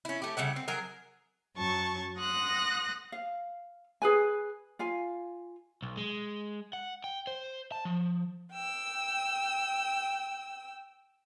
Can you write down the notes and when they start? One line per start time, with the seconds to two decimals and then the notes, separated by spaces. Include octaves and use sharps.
0.05 C#4 E4
0.22 A3 G4
0.37 C#3 G3 E4 F#5
0.56 C4
0.68 F#3 G#4 A#4
1.56 F#2 F#3 A5 C#6
2.19 F#5 C6 D#6 F#6 A#6
3.12 F5
4.02 G#4 B4 G#5
4.79 F4 F5 G#5
5.82 B1
5.97 G#3
6.73 F#5
7.04 G5
7.27 C5
7.72 A5
7.85 F3
8.52 G5 E6